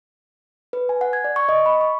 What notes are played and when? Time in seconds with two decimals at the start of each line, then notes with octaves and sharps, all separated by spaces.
0.73 B4
0.89 G#5
1.01 F#5
1.13 G#6
1.24 D5
1.36 C#6
1.49 D#5
1.66 B5
1.81 C#6